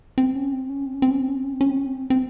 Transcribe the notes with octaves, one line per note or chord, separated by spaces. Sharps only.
C4
C#4
C4
C#4
C4
C#4
C4
C#4
C4
C#4
C4
C#4
C4
C#4
C4
C#4
C4
C4